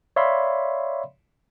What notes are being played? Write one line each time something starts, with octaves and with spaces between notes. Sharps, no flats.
C#5 D5 E5 F5 B5 C6